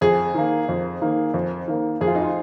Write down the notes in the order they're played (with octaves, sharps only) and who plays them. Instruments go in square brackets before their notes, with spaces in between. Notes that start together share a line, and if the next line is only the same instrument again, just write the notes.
[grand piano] F2 [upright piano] G#4
[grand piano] D#3 A#3
F2
D#3 A#3
F2
D#3 A#3
[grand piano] F2 [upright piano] G#4
[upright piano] F4
D#4
F4